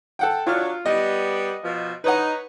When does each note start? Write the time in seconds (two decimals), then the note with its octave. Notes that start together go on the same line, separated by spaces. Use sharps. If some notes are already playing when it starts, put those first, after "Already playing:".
0.19 A4 F#5 G5
0.46 F#3 D4 F4 F6
0.86 G3 B3 D#5
1.63 B2 F3
2.04 D#4 B4 C#5 F#5